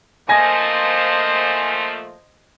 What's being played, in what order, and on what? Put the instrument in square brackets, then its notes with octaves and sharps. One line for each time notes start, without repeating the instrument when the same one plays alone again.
[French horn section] F3 A3 A#3 [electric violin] C5 D#5 [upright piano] G#5 A#6